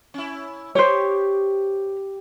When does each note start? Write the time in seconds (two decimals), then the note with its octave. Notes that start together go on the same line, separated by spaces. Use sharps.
0.14 C#4 E4
0.75 G4 C5 C#5